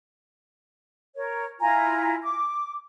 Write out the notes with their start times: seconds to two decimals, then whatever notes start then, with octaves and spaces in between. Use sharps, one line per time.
1.15 A#4 C#5
1.60 E4 F4 G#5 A#5
2.23 D6